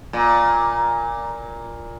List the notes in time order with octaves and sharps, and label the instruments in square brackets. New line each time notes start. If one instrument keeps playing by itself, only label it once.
[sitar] A#2